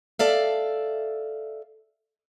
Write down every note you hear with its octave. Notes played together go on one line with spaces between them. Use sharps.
A4 D5 E5 F5